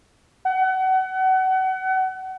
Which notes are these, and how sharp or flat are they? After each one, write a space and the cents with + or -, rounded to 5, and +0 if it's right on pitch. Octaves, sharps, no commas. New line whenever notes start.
F#5 +30